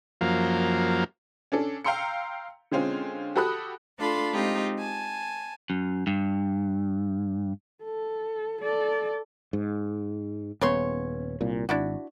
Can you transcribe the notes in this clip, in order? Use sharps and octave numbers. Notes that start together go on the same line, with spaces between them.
F#2 F3 A#3
C#4 D4 A4
F5 G5 A#5 C6 E6 C#7
D3 G#3 C4 C#4 F4
F#4 G4 A4 B5 D#6 F#6
A3 D4 F4 A4 B5 C6
G#3 C4 D#4 F4 G4
G#5 A5
F#2
G2
A4
A4 D5
G#2
D#1 C#3 B3 C#5 C6
C2 A#2
G#1 D4 E4 F#4